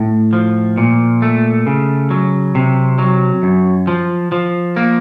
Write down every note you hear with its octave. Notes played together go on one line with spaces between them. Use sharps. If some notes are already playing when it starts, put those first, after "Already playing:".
Already playing: A2
F3
A#2
A3
C#3
F#3
C3
F#3
F#2
F3
F3
A#3